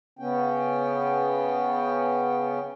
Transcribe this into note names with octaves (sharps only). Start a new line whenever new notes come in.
C#3 B3 C#4 G5